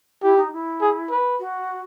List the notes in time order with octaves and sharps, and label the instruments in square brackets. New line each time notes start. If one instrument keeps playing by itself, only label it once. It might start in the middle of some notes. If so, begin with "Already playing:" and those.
[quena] E4 [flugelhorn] G4
[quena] D#4
E4
[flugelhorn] G#4
B4
[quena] F#4